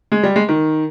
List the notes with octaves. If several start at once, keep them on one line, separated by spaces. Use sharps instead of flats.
G#3
G3
G#3
D#3